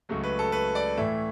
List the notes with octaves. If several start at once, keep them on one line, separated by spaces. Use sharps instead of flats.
C#2 C#3 F#3 A3
B4
A4
B4
D5
A2 E3 A3 E5